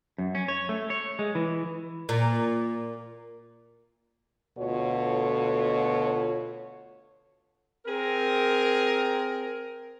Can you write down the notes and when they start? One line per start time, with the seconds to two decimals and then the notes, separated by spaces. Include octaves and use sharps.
0.18 F#2
0.35 C#4
0.48 C#5
0.69 A3
0.90 C#5
1.19 G#3
1.35 E3
2.09 A#2
4.57 D2 B2 F4 F#4 A4 C#5
7.85 C4 G#4 A#4